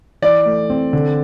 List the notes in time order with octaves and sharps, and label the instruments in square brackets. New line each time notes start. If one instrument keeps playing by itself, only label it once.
[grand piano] E3 [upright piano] D5
[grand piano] A3
C4
D3